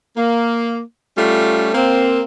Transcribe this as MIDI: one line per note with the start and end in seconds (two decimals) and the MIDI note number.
0.17 0.79 58
1.16 1.71 55
1.16 1.71 57
1.16 1.71 61
1.16 1.71 65
1.74 2.22 58
1.74 2.22 60